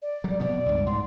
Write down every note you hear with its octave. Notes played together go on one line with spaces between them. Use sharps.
D5
F#3 G3
B2 F3 B3 D5
C#2 G2
G#2 C6